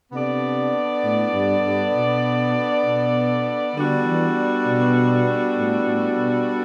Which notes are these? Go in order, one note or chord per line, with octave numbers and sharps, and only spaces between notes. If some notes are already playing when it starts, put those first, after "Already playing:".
C3 B3 D4 A4 D5
A2
G2
G2
B2
B2
D3 G3 B3 D4 F#4 A4
E3
B2
A2
A2
B2